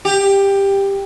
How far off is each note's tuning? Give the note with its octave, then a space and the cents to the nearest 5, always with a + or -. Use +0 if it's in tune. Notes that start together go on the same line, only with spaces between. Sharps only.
G4 +10